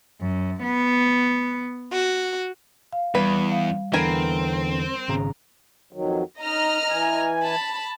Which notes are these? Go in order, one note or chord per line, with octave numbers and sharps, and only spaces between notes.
F#2
B3
F#4
F5
E2 G3 B4
F5
E2 D3 E3 C4 A#4 B4 G#5
G#1 C#3 A#5
F2 D#3 F#3
D#4 D#5 A#5 F6
E3 G#5
A5 B5